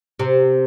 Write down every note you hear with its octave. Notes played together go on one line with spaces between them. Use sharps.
C3